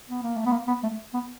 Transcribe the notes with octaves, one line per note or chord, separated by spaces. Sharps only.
B3
A#3
A3
B3
A#3
B3
A3
B3